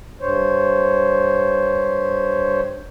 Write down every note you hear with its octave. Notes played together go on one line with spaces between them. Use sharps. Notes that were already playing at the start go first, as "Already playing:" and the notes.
G2 C5 C#5